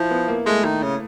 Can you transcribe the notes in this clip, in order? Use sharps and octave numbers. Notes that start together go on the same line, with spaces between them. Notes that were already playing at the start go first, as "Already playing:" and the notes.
Already playing: F3 E4
B3
A#3
G#3 A3
D#3
C#3